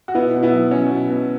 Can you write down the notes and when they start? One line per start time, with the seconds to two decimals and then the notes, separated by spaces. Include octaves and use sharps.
0.08 F#4
0.14 B2 B3 E4
0.34 B2
0.43 B3 E4
0.53 F#3
0.71 F#3 C#4
0.91 B2
1.10 B2